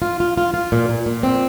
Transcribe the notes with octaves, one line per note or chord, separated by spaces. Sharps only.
F4
F4
F4
F4
A#2
A#2
A#2
C4